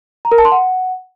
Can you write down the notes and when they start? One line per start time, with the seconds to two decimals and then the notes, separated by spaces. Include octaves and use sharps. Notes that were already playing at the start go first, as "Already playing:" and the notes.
0.25 A#5
0.32 A#4
0.38 A5
0.45 C6
0.52 F#5